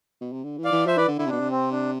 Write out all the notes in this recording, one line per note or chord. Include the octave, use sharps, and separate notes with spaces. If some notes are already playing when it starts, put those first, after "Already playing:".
B2
C3
D3
E3
D5 F5
E3
F3 C5 E5
E3 B4 D5
D3
D3 E4
C3
B2 D4
C3
C4
D4